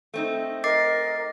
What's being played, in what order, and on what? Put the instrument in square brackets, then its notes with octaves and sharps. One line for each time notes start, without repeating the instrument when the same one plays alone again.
[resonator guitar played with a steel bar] A3 C4 D#4
[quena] A#4 [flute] D#5 [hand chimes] D6 A6 C7